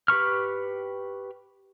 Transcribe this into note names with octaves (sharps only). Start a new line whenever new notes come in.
G4 B4 C#6 F6